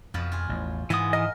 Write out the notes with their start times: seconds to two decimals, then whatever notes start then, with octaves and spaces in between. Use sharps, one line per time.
0.14 F2 B2 F3 B4
0.32 F4 G#4
0.49 A1 E2
0.90 G#2 E3 G#3 B3 D#6
1.13 A#4 D#5